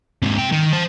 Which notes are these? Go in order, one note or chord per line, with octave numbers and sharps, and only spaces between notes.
G#2 C3
C3 G5
D#3
C5 A5